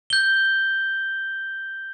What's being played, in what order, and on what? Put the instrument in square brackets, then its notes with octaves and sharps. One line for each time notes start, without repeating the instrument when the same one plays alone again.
[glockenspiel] G6 G7